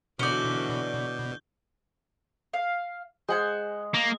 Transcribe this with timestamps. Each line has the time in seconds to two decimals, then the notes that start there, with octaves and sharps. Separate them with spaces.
0.19 B2 D3 E3 C#4 F#4 D5 G6 G7
2.53 F5
3.28 G#3 C5 F#5 G#5
3.94 A#3